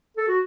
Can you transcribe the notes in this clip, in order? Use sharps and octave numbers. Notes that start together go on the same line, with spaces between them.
A4
F#4